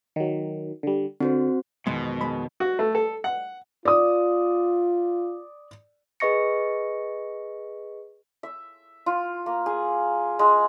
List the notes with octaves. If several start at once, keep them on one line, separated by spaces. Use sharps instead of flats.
D#3 F#3
D3 G3
D3 C4 F#4 C5
F2 B2 D#3 G#3
G#3 B4 B5
F#4
A3
A4
F#5
F4 D5 D#6
G#4 B4 D#5 C#6 A#6 C#7
E5
F4
A#3
G#4
G#3